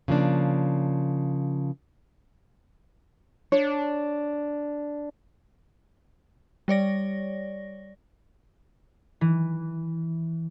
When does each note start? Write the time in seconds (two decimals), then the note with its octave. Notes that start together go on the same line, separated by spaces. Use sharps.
0.08 C#3 F3 A#3 D4
3.52 D4 C#5
6.68 G3 C#5 D5 A#6
9.21 E3